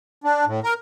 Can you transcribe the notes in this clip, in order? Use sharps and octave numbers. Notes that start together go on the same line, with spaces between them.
D4
A2
A#4